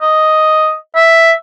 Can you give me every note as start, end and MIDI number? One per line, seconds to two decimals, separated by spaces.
0.02 0.74 75
0.95 1.32 76